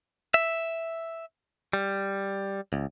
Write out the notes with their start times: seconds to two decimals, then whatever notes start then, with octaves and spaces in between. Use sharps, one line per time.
0.34 E5
1.73 G3
2.73 C#2